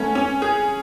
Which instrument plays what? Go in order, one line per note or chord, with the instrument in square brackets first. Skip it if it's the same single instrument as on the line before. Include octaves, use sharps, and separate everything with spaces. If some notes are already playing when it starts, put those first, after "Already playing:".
Already playing: [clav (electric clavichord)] A3 B3 [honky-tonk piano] C#4
[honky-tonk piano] C#4
G#4